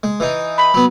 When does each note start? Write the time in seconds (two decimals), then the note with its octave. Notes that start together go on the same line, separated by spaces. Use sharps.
0.03 G#3
0.20 E3 D#4
0.58 B5
0.74 F#3 B3